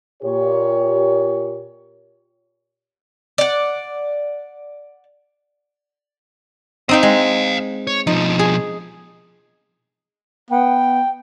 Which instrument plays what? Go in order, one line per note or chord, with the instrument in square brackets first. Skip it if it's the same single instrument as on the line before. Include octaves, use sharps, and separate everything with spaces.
[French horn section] A#2 G4 C#5
[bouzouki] D5 F#5
[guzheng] C4 D#4 G5 [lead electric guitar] D#5 F5
[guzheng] G#3
[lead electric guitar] C#5
[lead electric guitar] B2 F3 [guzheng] D#4
[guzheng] G#4
[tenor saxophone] B3 [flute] G5